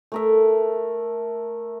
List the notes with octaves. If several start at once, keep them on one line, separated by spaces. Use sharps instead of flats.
A3 A#4 E5